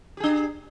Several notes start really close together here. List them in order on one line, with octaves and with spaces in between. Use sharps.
G4 G#4 D4